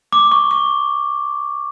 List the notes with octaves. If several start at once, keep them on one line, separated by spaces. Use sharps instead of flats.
D6
C#6
C#6